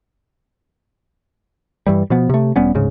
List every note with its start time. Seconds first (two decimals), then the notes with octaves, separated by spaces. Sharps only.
1.87 G2 E3 G3
2.10 B2 F3 B3
2.30 C3 A3
2.56 E1 G3 B3 C#4
2.74 D1 G#2 C#3